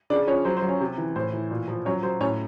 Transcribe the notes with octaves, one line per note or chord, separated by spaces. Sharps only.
C#3 D4 D5
F3 C#4 C#5
F#3 C5
C5
F#3
C#4 C#5
C3
E3
A2 C5
E3
A#2
F3
F#3 C#4 C#5
F#3 C5
A2 C#4 C#5